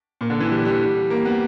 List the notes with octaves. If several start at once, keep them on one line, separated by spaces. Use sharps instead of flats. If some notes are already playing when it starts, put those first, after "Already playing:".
A#2
D3
E3
G3
G3
A#3
B3